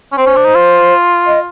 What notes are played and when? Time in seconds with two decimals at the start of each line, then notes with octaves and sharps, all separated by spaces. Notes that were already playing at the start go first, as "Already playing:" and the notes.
0.12 C#4
0.17 C4 C5
0.26 C#4
0.36 D4
0.45 D#4
0.55 F4
1.27 D#5